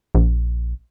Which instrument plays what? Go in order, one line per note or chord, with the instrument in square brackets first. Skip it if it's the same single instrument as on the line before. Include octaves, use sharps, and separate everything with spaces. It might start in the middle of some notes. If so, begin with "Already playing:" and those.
[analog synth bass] A#1